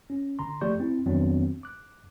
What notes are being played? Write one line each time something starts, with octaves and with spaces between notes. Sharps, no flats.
C#4
G1 D3 A#5 C6
F3 A3 G4 D5 C#6 G6
C4 E4
F2 D#3 F#3 B3 C4 D4
D6 F#6